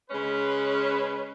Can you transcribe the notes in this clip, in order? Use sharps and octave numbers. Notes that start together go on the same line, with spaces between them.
C#3 G#3 C#4 B4